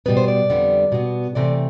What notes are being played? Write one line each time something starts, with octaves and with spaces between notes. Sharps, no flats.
B2 G3 B3 B4
C5
D5
F2 D3 G3 B3
B2 B3
C3 E3 A3 C4 D5